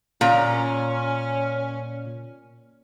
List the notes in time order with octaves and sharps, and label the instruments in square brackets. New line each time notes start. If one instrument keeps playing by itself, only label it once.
[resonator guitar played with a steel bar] A#2 A#5 [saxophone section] C#4